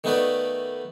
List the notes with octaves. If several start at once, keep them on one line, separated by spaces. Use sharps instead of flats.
D#3 A3 B3 D#4 B4 D5